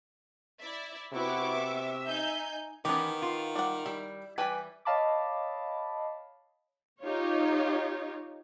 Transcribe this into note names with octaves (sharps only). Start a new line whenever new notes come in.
E4 D5 E5
C3 B3 E4 F#4 B4 C#6 D6
E5
D#4 G#5 G6
D#3 E3 B3 C#4 G4
F4
G3 F#5
G3 E4
E3 G3 B4 G5 G#5
C#5 D#5 F5 A5 B5 D6
D#4 F4 G4 C#5